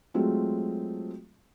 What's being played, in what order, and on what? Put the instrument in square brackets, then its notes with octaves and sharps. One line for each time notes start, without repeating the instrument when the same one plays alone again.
[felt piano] F#3 G#3 A3 C4 F4